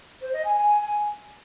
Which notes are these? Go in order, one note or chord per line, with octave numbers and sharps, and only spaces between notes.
C5
D#5
G#5
G#5